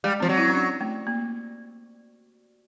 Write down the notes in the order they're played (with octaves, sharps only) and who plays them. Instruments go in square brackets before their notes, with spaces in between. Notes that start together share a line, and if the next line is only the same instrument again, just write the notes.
[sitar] G3 [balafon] G#3
[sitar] F3 [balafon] C4
[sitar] F#3
[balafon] E4
C#4
D4
A3
A#3